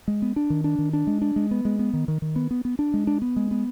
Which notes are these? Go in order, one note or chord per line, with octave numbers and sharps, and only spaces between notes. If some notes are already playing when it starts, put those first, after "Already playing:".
G#3
B3
D4
D#3
D4
D#3
D4
G#3
D4
G#3
B3
G#3
B3
D#3
D#3
D#3
B3
B3
B3
D4
G#3
D4
B3
G#3
B3